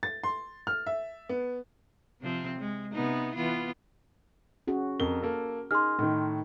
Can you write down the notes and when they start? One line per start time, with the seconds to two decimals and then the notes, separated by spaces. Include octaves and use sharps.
0.03 A6
0.24 C6
0.67 F6
0.86 E5
1.29 B3
2.21 C3 F3 C4
2.59 G#3
2.93 C3 B3 D#4
3.35 E3 B3 F4
4.68 C#4 F#4 G#4
5.00 F2 A#4 G7
5.22 A#3 A4
5.71 D#4 G#4 C6 F6
5.99 A2 D#3 D#4